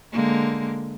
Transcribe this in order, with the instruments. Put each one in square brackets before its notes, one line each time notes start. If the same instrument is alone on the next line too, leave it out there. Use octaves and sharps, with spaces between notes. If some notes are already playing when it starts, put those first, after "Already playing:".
[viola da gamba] D3 G#3 A#3